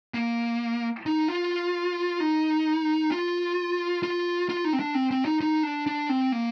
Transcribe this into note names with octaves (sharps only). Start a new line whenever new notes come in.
A#3
D#4
F4
D#4
F4
F4
F4
D#4
C4
D4
C4
C4
D#4
D#4
D4
D4
C4
A#3